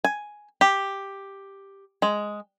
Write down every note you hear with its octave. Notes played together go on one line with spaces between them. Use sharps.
G#5
G4
G#3